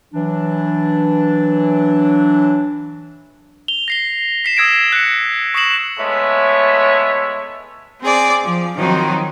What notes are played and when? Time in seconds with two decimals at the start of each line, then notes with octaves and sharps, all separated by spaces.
0.14 E3 F#3 D4
3.68 F7 G7
3.88 A#6 C7 G7
4.45 B6 C7 E7
4.57 D#6 E6 G#6 A#6 D7 E7
4.92 F#6 C#7
5.54 C#6 D#6 A#6 C7 E7 F#7
5.99 G#3 A3 B3 E4 C#5 E5
8.01 C4 G#4 D5
8.43 F3
8.76 D#3 F3 F#3 C4 D#4